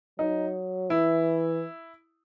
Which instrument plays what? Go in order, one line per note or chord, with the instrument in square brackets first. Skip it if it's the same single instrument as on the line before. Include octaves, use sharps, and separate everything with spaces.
[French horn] F#3 [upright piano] D#4
[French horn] E3 [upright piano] E4